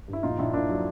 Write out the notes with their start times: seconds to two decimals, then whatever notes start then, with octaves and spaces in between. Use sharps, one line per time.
0.08 G2
0.13 E4
0.23 A#1 D#4 F4
0.38 A#1 D4 E4
0.53 A#2 D4 E4
0.69 F#3